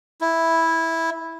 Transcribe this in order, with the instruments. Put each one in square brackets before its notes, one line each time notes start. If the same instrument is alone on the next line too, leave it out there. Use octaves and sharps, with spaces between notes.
[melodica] E4